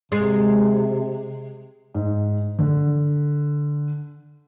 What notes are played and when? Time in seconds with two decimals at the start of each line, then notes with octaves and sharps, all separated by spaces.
0.12 C3 G#3
1.95 G#2
2.59 D3